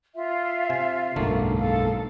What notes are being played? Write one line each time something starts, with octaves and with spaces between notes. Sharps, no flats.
F4 E5
C3 G#5
F#1 B1 G#2 D3 A3 A#3
A4 F5